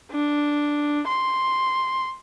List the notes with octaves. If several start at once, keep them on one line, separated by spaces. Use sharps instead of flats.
D4
C6